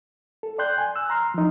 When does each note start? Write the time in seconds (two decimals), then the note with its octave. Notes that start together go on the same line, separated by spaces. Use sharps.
0.43 A4
0.58 D5 G5 C6 F#6 G6
0.78 G#5
0.96 E6 F#6
1.10 A#5 C6 F6
1.34 F3 D#4